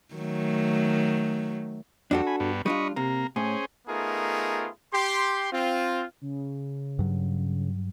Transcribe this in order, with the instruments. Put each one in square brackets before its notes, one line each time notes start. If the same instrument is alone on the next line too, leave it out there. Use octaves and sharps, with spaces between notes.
[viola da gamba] D#3 F#3 A3
[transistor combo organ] F2 G3 [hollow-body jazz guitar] D4 F#4 A4
[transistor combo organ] G#5 B5
G2 B3
[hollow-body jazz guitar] G3 D4 F4 [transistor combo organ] D#5 B5 C#6
[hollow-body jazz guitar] C3 [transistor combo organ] A#3 A#5
[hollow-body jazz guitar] A2 [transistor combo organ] C#4 G#4 C5
[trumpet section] A3 B3 D#4 F4 G#4 A#4
G4 C6
C4 F4
[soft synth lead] C#3
[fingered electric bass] G2 F#3